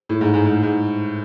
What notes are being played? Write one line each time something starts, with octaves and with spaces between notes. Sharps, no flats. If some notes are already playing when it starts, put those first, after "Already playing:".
A2
G#2
G#2
G#2
G#2